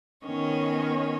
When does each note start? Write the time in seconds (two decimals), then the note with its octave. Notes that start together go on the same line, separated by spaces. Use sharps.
0.25 D#3 B3 C#4 C#5 D#5